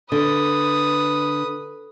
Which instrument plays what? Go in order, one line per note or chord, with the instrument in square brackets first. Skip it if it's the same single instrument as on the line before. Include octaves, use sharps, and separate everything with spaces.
[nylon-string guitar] D3 [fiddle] B4 D#6